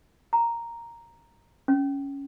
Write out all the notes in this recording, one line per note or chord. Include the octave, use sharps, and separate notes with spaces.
A#5
C#4